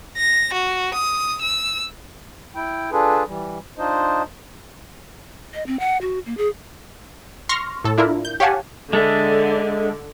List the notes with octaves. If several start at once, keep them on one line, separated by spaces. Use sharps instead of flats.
A#6
F#4
D#6
E6
E4 G5
D4 F4 G#4 A4 B4
E3 G3
D4 D#4 F4 C5 D#5
D#5
C4
F#5
F#4
A#3
G#4
C6 C#6 F6 A#6
A2 A4
D4 E4 F4 A#4
G6
G4 C#5 F5 F#5 G#5 A5
D3 G#3 A4 E5